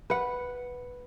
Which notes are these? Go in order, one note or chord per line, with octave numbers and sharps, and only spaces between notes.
B4 F#5